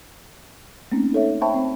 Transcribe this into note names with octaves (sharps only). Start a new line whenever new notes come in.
A3 A#3 C4 C#4 D#4
D#4 A4 C#5 E5
C5 E5 G5 A5 B5 C#6
C4